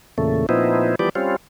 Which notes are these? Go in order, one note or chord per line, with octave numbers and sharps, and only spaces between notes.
E2 A#2 C#3 A3
A#2 F3 B3 C4 D#4 E4
E3 F3 G3 B3 G4 D5
G3 C4 C#4 F4